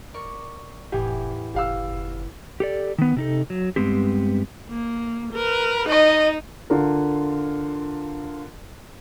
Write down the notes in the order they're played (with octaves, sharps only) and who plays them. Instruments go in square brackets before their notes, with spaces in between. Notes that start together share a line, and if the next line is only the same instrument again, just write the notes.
[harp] A#4 D5 C#6
[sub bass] F1 [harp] E2 A2 G#5 [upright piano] G4
[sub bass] F#1 [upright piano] G4 F5 E6
[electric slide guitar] G4 A4 D5
D#3 B3
C3 D#4 A4
F#3
G2 B2 G#3 B3 C4 G4
[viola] A#3
A#4 B4
[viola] D#4 [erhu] D#5
[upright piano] D3 F4 A#4